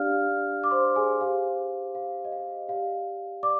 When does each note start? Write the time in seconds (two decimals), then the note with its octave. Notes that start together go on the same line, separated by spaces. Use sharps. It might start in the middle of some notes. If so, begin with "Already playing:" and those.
Already playing: D4 G4 D5 F5 F6
0.64 D6
0.71 C5 C6
0.96 G#4 G#5
1.20 G4 C5 F5
1.95 F5
2.25 D#5
2.32 F5
2.68 G4 D5 F5
3.43 D5 D6